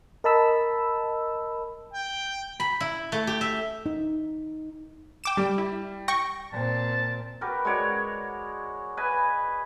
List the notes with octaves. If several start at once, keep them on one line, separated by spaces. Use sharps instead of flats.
A#4 D#5 A5 B5 E6
G5
B5
E4
A3
G4
E5
D#4
G5 D6 E7
G3
E4
G5 C#6 A#6
A#2 C4 A5
F#4 G4 A#4 B4
G#3 F#4 C#5 D5
B4 D#5 G#5 B5